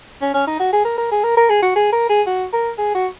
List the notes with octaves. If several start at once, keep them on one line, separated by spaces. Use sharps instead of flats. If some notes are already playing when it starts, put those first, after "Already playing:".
C#4
C#4
D#4
F#4
G#4
A#4
A#4
G#4
A#4
A#4
G#4
F#4
G#4
A#4
G#4
F#4
A#4
G#4
F#4